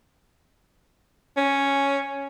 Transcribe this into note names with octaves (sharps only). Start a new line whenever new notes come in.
C#4